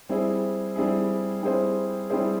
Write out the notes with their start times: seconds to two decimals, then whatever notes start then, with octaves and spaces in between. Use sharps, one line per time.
0.09 G3 C4 E4 G#4
0.76 G3 C4 E4 G#4
1.43 G3 C4 E4 G#4 C5
2.10 G3 C4 E4 G#4 C5